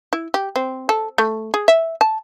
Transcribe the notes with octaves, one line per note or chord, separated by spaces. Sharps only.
E4
G4
C4
A4
A3
G#4
E5
A5